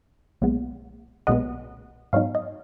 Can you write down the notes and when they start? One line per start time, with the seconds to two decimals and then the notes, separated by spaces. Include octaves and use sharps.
0.41 B1 A#2 G#3 B3
1.27 B1 A#2 G#3 B3 D#5 F#5
2.13 G#2 F#3 B3 D#4 C#5 F5
2.35 D#5